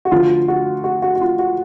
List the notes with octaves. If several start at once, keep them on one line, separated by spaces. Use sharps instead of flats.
F#4
D2 D3 F3 F4
F#4
F#4
F#4
F#4
F4
F#4